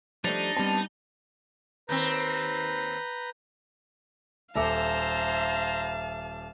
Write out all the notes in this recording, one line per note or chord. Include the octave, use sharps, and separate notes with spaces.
F3 G3 A3 D4 D#4
G3 B3 C4 A5
D#2 C4 B4 A#5 G6
D#1 A4 C5 E5 F5 A5 A#5 D6